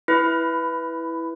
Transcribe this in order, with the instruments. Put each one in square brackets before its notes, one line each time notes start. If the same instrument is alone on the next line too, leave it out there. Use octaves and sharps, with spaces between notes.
[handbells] E4 B4